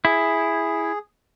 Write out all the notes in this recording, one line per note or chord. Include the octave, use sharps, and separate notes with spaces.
E4 G#4